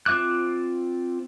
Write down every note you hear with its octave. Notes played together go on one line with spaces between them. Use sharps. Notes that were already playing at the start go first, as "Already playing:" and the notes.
C4 F4 E5 D6 F#6